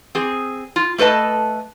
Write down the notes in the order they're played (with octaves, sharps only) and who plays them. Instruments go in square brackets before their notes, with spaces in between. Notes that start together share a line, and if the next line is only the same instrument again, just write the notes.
[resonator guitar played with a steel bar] C4 G#4
F4
A3 A4 B4 D#5 A5